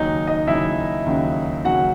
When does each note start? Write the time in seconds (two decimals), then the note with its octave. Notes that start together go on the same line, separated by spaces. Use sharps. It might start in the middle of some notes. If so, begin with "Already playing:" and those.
Already playing: D#2 C#3 F#3 C#4 D#4 D#5
0.27 D#4 D#5
0.47 D#2 C#3 F#3 C#4 E4 E5
1.06 D#2 C#3 F#3 C#4
1.65 D#2 C#3 F#3 C#4 F#4 F#5